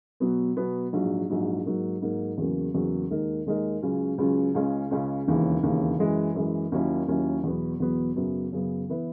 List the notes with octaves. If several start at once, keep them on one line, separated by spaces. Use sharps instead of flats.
B2 F#3 B3
B2 F#3 B3
A#1 G#2 F#3
A#1 G#2 F#3
G#2 F#3 A#3
G#2 F#3 A#3
E2 C#3 F#3 A#3 C#4
E2 C#3 F#3 A#3 C#4
D#2 D#3 G#3 D#4 A#4
D#2 D#3 G#3 D#4 A#4
C#2 C#3 F#3 C#4
C#2 C#3 F#3 C#4
C#2 C#3 G#3 C#4
C#2 C#3 G#3 C#4
E1 D#2 C#3 E3
E1 D#2 C#3 E3
F#2 E3 G#3
F#2 E3 G#3
D#2 D#3 F#3 C#4 E4
D#2 D#3 F#3 C#4 E4
E2 B2 F#3 B3
E2 B2 F#3 B3
F#2 C#3 F#3 B3
F#2 C#3 F#3 B3
E3 B3 E4 B4